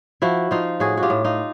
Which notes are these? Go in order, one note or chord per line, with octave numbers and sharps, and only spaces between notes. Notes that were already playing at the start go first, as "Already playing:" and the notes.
F3 E4 F#4
F3 D#4 F4
A2 F#4 G#4
F#4
F4 G4
A2
D#4 F4